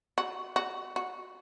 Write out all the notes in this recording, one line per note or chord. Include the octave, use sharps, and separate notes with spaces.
F#4
F#4
F#4